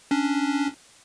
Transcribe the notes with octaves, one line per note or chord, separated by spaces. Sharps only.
C#4 D4